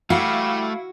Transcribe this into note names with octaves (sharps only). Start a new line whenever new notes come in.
G3 A3 E4 F#4 F5